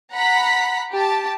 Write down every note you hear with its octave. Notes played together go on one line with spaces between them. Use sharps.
F#5 A#5 B5 B6
G4 A5